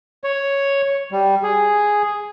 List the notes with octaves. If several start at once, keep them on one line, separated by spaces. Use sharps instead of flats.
C#5
G3
G#4